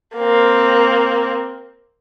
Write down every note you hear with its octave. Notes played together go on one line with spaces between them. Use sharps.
A#3 C4